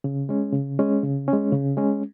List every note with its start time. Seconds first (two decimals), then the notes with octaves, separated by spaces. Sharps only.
0.04 C#3
0.29 G#3 C#4
0.53 C#3
0.79 G#3 C#4
1.03 C#3
1.28 G#3 C#4
1.52 C#3
1.77 G#3 C#4